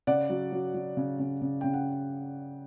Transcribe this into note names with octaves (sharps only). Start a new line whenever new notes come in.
C#3 D5 F#5
F#3
F#3
F#3
C#3
C#3
C#3
C#3 G5
F#5